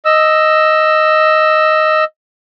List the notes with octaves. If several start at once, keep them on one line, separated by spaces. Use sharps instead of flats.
D#5 E6